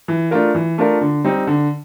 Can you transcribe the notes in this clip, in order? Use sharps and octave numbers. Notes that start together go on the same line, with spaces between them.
E3
A3 D4 F4 A#4
E3
A3 D4 F4 A#4
D3
G3 C4 D#4
D3